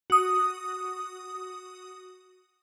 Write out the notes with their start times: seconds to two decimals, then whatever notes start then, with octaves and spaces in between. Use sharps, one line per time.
0.10 F#4 D#6